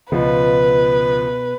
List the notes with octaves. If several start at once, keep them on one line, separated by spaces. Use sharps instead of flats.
C#2 B2 F3 B4